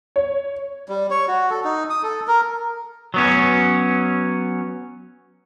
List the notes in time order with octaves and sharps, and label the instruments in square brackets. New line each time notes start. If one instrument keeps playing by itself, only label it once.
[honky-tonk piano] C#5
[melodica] G3
C#5
F#4
A4
D#4
D#6
A4
A#4
[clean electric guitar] F#3 B3 C#4